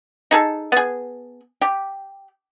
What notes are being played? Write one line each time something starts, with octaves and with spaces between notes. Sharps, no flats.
D#4 G#4 A4
B3 G#4
G4